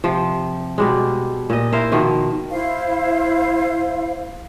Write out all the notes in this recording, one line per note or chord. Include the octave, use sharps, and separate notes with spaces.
C3 F3
B2 G3 G#3
A#2 D#5
E4 A#4 C5 F5
B2 D#3 F3 E5
E4 C5 F5